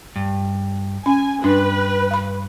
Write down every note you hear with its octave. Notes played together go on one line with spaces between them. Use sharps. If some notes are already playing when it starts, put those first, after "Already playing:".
G2
C#4 G#5
G2 D4 B4
F5 B5